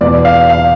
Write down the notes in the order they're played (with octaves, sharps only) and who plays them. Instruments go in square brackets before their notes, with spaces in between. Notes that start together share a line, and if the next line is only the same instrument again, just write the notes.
[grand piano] E2 B2 D5
F5
F5